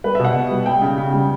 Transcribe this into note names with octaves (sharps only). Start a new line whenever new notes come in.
G3 B4
E5
B2 F#5
B2
G3
G3 G5
C#3
C#3
G3